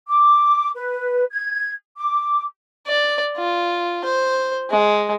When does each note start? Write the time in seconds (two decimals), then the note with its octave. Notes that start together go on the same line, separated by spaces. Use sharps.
0.07 D6
0.75 B4
1.30 G#6
1.96 D6
2.87 D5
3.37 F4
4.05 C5
4.70 G#3